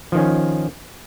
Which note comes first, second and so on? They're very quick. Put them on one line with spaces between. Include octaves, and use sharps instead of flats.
F3 D#3 C#4